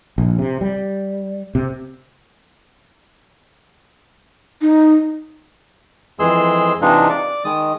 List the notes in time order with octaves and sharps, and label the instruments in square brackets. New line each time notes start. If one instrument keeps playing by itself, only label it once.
[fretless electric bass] A#1
C3
G3
C3
[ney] D#4
[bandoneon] F2 E3 G#3 G#4 C6 E6
C3 E3 G#3 D4 D#4 F4
D5
D#3 G#3 D#6